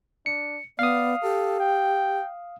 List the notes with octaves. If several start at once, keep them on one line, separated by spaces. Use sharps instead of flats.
D4 C#7
B3 D5 F5 D#6
G4 A4
G5